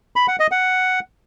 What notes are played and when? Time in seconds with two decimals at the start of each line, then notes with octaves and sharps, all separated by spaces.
0.16 B5
0.28 F#5
0.40 D#5
0.52 F#5